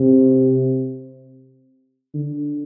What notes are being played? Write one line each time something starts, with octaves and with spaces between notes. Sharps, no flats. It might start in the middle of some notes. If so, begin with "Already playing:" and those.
Already playing: C3
D3